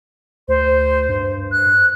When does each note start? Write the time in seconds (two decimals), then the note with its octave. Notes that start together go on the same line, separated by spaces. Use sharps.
0.48 D2 C5
1.09 G2
1.52 F#6